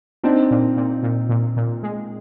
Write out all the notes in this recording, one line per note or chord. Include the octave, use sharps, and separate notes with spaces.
C4 D4 D#4
A#2
A#2
A#2
A#2
A#2
G#3